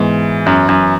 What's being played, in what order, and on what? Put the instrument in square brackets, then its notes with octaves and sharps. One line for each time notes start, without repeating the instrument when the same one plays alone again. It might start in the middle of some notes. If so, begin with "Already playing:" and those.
Already playing: [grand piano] G#2 [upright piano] E3 B3 E4
[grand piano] F#2
F#2